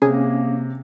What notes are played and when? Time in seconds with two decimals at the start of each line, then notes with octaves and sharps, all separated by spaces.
0.02 C3 A#3 C#4 G#4